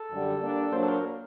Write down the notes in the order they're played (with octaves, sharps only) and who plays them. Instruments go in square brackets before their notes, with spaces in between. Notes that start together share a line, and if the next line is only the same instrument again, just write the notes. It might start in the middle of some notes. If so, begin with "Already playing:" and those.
Already playing: [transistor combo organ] A4
[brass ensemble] F#2 D3 G3
G3 A#3 D4
[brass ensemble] A#2 F#3 A#3 D4 [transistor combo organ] C5
[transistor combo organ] A4
A#4